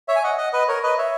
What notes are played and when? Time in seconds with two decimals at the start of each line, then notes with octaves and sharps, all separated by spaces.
0.08 C#5 E5
0.16 G#5
0.23 D#5 F#5
0.38 D#5 F#5
0.53 B4 D#5
0.68 A#4 C#5
0.83 B4 D#5
0.98 C#5 E5